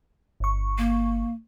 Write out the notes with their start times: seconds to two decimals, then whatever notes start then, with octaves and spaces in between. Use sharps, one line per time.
0.40 G1 C#6
0.78 A#3